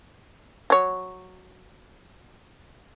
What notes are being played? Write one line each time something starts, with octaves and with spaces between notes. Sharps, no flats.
F#3 C#5